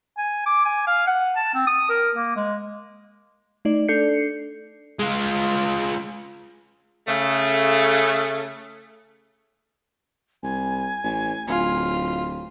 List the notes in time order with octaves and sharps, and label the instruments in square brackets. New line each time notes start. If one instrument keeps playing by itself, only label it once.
[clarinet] G#5
D6
G#5
F5
F#5
A5
C4
D#6
A#4
A#3
G#3
[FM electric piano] A3 D#4 D5
D4 A4 D5 G6 C7 C#7
[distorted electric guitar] G#3 F4
[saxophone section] C#3 A3
[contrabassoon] C2 [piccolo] G#5
[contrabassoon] A1
[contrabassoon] D1 [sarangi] F4